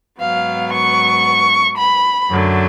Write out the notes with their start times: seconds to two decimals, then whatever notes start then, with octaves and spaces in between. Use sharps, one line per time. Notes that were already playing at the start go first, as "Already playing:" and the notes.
0.20 G#2 F#3 B3 F5
0.73 C#6
1.78 B5
2.30 F#2 D3 F#3 A3